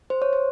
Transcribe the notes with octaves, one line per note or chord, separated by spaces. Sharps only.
C5
C#5
C5